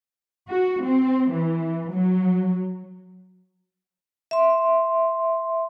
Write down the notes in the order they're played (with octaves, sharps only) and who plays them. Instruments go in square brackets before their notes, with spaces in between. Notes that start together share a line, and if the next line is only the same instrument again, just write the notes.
[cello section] F#4
C4
E3
F#3
[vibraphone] E5 C6